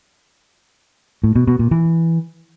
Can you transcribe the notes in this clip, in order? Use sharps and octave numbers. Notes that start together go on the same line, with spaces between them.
A2
B2
B2
A#2
E3